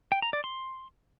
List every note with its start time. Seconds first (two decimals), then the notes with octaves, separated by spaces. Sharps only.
0.12 G5
0.22 A#5
0.33 D5
0.44 C6